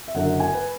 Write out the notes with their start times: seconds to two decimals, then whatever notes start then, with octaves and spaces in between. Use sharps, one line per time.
0.08 E5
0.14 F#1 F#2 D3 F#5
0.40 G#5
0.54 B4